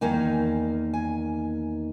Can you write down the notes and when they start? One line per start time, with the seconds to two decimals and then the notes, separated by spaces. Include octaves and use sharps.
0.01 E2 D#3 A#3 D#4 G#5
0.94 G#5